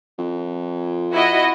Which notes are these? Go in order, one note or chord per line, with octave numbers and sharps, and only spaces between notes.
F2
E4 F#4 D#5